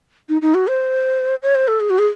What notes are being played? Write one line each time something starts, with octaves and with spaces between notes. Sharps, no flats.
D#4
D#4
F#4
C5
C#5
C5
A4
G#4
F#4
G#4